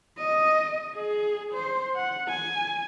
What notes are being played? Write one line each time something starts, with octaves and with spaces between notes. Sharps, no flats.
D#5
G#4
C5
F#5
G#5